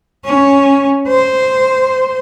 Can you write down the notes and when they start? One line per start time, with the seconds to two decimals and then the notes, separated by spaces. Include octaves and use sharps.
0.25 C#4
1.08 C5